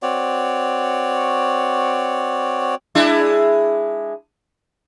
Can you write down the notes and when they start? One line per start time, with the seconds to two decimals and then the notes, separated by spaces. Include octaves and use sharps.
0.03 C4 F#4 C#5 D5
2.95 G#3 D4 E4